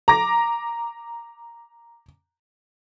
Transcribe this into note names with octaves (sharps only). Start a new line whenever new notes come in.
A#5 D6 A#6